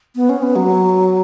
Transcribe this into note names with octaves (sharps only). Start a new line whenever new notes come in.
B3
C#4
B3
F#3